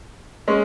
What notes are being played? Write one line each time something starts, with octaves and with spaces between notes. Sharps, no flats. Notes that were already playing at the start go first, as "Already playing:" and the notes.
G#3 C#4